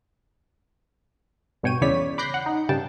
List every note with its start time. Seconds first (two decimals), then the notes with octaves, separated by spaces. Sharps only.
1.63 G2 B2 C#5 G5 D#7
1.81 E2 C#3 E4 C#5 D5 B6
2.18 B5 D6 F#6 G6 A#6 C7
2.34 F#5
2.46 D#4
2.69 G2 C#3 G3 G5 A5